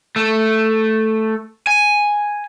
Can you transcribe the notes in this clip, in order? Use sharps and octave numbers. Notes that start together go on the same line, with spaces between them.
A3
G#5